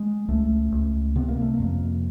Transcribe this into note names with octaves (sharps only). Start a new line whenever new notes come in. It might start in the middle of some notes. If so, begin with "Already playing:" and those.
Already playing: G#3
C#2 A3
C#2
C3 B3
A#3
A3
A#3
F2